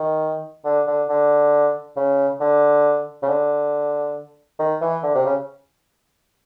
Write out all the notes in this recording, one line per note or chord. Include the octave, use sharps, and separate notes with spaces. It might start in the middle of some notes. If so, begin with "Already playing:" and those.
Already playing: D#3
D3
D3
D3
C#3
D3
C#3
D3
D#3
E3
D3
C3
C#3